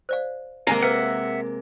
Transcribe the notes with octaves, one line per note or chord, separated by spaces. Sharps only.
C5 D5 F5
C3 G#3 A#3 F5 G#5 A#5
B4 E5 F#5